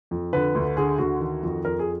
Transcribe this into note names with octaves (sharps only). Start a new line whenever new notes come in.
F2
D3 B4
D2
D3 G#4
D2 F#4
D#3
F2
F2 A#4
G#4